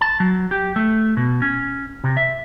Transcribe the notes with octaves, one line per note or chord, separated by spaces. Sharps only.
A5
F#3
G4
A3
B2
C#4
C3
E5